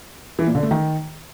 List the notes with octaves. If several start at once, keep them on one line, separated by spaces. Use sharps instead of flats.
E3
A#2
D3
A3
D#3